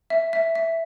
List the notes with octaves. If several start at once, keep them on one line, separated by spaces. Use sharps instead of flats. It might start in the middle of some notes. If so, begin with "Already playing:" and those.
E5
E5
E5